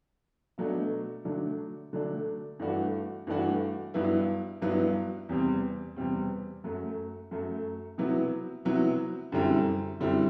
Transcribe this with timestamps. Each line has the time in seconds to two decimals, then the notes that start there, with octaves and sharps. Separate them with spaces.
0.58 B2 F#3 A3 D4
1.25 D3 F#3 A3 D4
1.93 D3 F#3 A3 D4
2.60 G2 E3 A3 D4 F#4
3.27 G2 E3 A3 D4 F#4
3.94 G2 F#3 B3 E4
4.62 G2 F#3 B3 E4
5.29 E2 C3 G3 C4
5.97 E2 C3 G3 C4
6.64 F#2 F#3 A3
7.31 F#2 F#3 A3
7.98 C3 F#3 B3 E4
8.65 C3 F#3 B3 E4
9.32 F#2 D3 G3 C4 E4
10.00 F#2 D3 G3 C4 E4